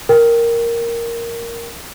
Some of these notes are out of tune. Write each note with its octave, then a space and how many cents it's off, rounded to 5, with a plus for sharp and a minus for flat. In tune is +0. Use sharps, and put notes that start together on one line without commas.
A#4 +0 G5 +0